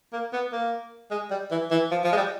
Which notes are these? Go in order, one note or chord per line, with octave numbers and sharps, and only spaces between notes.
A#3
B3
A#3
G#3
G3
E3
E3
F3
F3
G#3
G3